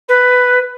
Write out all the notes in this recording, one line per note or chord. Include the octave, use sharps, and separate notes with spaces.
B4